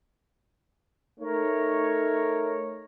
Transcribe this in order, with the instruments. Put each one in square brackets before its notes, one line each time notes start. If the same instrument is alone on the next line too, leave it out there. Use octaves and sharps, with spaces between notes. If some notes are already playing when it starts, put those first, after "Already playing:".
[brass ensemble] A3 D#4 A#4 C#5